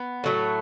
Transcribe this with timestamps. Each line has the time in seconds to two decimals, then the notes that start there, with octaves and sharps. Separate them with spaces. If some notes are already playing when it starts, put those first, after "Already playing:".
Already playing: B3
0.24 A2 F#3 A3